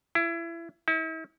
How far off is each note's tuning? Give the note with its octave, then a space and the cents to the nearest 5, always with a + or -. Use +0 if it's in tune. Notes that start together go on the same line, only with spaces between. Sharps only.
E4 +25
E4 -45